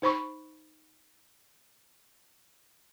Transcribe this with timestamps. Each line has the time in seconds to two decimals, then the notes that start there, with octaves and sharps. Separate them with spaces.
0.02 D#4 C5 B5 C#6